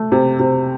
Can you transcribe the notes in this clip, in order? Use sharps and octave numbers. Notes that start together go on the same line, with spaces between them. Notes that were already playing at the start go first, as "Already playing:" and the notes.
Already playing: A3
C3
C3